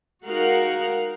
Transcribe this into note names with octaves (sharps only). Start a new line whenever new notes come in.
G#3 D#4 F#4 A#4 F5 F#5